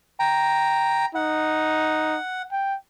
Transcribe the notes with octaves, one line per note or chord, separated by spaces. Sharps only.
G5 A#5
D#4 F#5
G5